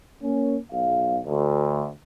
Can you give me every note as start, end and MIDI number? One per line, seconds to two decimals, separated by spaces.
0.23 0.56 58
0.23 0.56 61
0.71 1.19 35
0.71 1.19 77
1.26 1.89 38